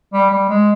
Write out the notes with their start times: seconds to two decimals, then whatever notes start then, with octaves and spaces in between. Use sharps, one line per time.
0.13 G3
0.30 G3
0.49 G#3